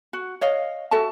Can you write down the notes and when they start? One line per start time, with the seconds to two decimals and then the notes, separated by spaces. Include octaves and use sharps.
0.13 F#4
0.41 C#5 D#5 F5
0.91 F#4 A4 E5 A5